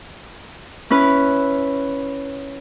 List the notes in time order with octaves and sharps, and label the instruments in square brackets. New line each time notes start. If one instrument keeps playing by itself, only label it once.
[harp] C#4 E4 B4